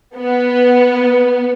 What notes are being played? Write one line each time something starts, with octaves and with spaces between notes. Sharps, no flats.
B3